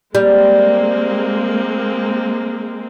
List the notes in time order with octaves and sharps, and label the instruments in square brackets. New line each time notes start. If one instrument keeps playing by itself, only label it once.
[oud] G3 [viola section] G#3 A#3 C4